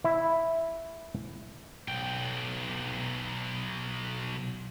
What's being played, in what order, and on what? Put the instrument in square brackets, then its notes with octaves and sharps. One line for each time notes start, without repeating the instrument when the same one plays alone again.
[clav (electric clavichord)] E4 E5
[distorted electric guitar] B1 G5